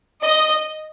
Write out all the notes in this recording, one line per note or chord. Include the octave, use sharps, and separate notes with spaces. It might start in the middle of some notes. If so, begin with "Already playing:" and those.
D#5